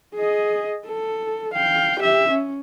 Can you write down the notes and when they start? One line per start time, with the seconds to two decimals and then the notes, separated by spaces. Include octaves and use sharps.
0.15 G#4 D#5
0.86 A4
1.54 F5 G5
2.00 G4 E5
2.31 C#4